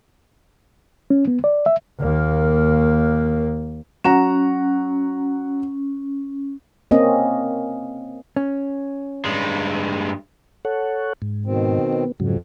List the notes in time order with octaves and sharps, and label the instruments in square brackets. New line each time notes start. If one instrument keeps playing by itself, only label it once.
[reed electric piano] C#4
B3
D5
E5
[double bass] D#2 A#3
[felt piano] F#3 F#5 A#5 [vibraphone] C#4
[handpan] A#3 C4 C#4 D#5
[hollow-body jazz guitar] C#4
[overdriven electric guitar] G2 G#3
[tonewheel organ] A4 C#5 F#5
G#2
[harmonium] B2 D#3 C4
[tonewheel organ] B3
[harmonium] F2 [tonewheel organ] G#2 C#3 F#3